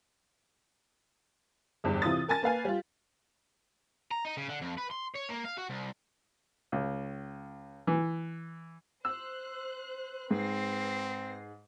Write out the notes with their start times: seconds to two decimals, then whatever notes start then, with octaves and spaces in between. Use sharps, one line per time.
1.84 G1 E2 G2
2.02 C3 E3 F4 D#6 A6
2.28 A#4 G#5 A5 A6
2.42 A#3 B4 F5 G#5
2.65 G3 F4
4.11 A#5
4.25 D#4
4.37 C#3
4.49 D3
4.61 F2
4.77 B4
4.90 C6
5.14 C#5
5.29 A#3
5.44 F5
5.57 F#4
5.69 C2
6.72 C#2
7.87 E3
9.05 C5 E6 F#6
10.31 G#2 C4 B4 A#6 C7